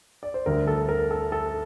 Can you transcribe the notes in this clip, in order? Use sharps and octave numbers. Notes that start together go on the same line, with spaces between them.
D5
C5
D2 D3 G3 A#4
A4
A#4
A4
A4